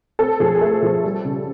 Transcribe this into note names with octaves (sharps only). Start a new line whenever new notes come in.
C4 A4
F3 G#4
G#4
A3 A4
F3
G3
C#3